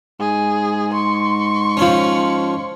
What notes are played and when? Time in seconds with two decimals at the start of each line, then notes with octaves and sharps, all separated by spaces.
0.20 G#2 G#4
0.94 C6 C#6
1.77 F3 C#4